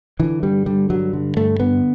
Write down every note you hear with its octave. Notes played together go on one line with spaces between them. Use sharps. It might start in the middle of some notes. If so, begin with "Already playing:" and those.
D3 E3
G2 G3
D3 G3
G2 F#3
D3
G2 A3
D3 B3